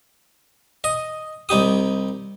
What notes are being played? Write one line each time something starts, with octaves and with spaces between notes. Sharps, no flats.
D#5
C2 D#4 G4 D#6